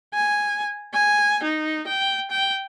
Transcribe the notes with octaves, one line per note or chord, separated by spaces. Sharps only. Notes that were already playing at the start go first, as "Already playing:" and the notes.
G#5
G#5
D#4
G5
G5